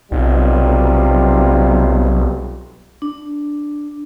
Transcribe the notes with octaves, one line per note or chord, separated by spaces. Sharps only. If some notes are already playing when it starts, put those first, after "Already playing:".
B1 C3 G3 F4
D4